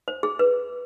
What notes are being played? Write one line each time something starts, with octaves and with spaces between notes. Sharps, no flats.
C5
G#4
B4